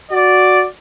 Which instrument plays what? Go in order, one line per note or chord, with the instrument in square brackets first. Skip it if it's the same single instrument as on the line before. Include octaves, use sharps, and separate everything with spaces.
[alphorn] F#4 [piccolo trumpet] D5